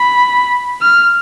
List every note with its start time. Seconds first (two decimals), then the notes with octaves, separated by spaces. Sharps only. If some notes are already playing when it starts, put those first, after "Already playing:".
Already playing: B5
0.82 F6